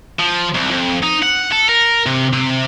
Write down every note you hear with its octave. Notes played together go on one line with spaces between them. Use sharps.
F3
C2
F2
D#4
F#5
A4
A#4
C3
C3